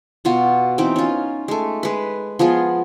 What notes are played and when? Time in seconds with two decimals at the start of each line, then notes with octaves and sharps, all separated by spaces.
0.25 B2 F4 F#4
0.78 E3 C4 D#4 D6
0.96 C#4 F4
1.48 G#3 A3
1.83 G#3 B4
2.39 F3 B3 F4 G#4